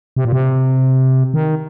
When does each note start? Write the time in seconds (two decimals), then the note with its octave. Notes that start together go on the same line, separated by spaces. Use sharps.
0.16 C3
0.25 A#2
0.33 C3
1.34 D#3